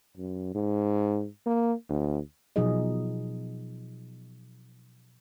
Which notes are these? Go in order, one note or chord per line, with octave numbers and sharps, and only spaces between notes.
F#2
G#2
A#3
D2
B2 F3 F#3 D#4 G#4 D#5